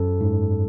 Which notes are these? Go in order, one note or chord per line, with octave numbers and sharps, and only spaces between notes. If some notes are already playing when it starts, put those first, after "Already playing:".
Already playing: F#2 A4
G#2